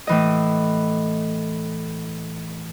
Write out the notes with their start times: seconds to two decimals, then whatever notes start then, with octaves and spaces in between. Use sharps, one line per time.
0.07 A2 E3 D#5